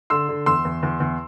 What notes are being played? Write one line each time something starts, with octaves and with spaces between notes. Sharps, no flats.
D3 C6 E6
D3
E2 C6 E6
E2
E2
E2